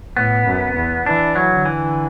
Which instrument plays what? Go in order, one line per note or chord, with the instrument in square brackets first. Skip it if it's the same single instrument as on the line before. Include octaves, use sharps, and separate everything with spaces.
[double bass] A2 [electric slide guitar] B3
[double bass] F#2
E2
[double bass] E3 [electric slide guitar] D4
[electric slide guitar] F#3
[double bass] D3
[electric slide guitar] E3